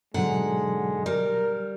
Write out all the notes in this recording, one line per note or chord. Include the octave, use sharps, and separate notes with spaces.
G#2 B2 D3 F#3 G#3 F#5
G3 A#4